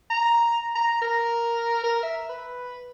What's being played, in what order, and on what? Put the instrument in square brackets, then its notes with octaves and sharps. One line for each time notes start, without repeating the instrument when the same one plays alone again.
[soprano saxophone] A#5
A#5
A#4
A#4
E5
B4